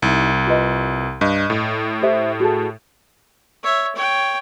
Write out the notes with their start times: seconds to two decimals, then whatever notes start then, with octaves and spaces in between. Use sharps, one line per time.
0.02 C2 D#4 E4
0.47 F4 B4 D#5
1.21 G2 D#5
1.50 A2
2.02 G4 C5 E5
2.40 F#4 G#4 A4
3.63 C#5 E5
3.95 C#5 G5